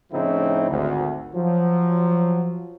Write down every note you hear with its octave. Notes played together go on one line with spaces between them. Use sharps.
A2 C#3 F3 C4 D#4 E4
G#1 D2
F3 F#3